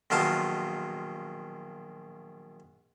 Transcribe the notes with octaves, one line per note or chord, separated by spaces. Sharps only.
A#1 B2 D#3 F#3 F4 A5